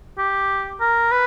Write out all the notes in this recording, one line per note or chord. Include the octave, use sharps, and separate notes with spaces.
G4
A#4
B4